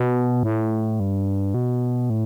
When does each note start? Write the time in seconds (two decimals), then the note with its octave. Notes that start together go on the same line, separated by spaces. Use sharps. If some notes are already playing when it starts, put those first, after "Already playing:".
Already playing: B2
0.43 A2
1.00 G2
1.54 B2
2.10 A2